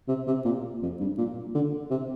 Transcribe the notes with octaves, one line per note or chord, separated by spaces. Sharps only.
C3
C3
A#2
F2
G2
A#2
D3
C3